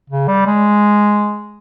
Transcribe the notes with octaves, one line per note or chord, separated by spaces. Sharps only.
C#3
G3
G#3